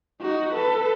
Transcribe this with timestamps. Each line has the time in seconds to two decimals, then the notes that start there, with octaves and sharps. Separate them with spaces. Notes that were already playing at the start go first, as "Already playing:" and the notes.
0.22 D#4 F#4
0.53 A4 B4